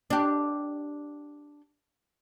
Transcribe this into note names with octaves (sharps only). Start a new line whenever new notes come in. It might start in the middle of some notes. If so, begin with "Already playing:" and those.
D4 G4